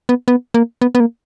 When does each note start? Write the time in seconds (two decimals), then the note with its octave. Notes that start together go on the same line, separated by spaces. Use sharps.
0.09 B3
0.28 B3
0.54 A#3
0.81 B3
0.95 B3
1.00 A#3